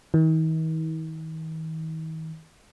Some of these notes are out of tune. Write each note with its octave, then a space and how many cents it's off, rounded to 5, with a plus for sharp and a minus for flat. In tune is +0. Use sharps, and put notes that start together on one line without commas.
D#3 +45